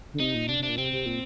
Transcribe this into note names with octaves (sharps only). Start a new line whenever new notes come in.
D3
C3 D#4
A#2
C3 D4
C3
D4
A#2
C3 C4
C3
A#2